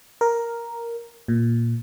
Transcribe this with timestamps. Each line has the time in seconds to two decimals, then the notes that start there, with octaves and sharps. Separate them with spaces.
0.21 A#4
1.28 A#2